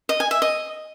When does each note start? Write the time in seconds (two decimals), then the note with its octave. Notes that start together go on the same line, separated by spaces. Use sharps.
0.09 D#5
0.20 G#5
0.31 E5
0.42 D#5